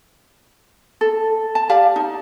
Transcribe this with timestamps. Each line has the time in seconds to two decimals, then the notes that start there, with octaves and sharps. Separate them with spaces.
1.01 A4
1.55 A5
1.69 G4 D5 F5 A5
1.96 D#4